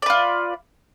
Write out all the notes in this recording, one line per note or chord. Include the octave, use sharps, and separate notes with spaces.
F4 B4 D5